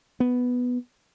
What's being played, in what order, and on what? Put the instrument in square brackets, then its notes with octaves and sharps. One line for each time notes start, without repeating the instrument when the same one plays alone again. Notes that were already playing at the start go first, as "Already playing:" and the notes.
[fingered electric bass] B3